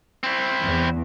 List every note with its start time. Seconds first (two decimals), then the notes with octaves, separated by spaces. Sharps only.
0.23 C4 E4
0.64 E2